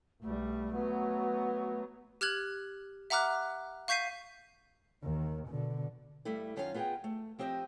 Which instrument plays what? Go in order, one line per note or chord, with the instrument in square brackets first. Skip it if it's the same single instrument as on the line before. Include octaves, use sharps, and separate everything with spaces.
[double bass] B1 G3 [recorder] A3
[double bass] F#3 B3
[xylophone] G4 F6 F#6 G#6 F#7
E5 F#5 A#5 D6 F6 F#6
F5 C#6 G6 B6 C7 D#7
[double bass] D#2 D#3
B2 D3
[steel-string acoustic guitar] G2 G3 A3 E4
F#2 D#3 C#4 F4 G#4 F5
B3 F4 G#4 A#4 D#5 G5
A3
F3 C4 G4 D#5 E5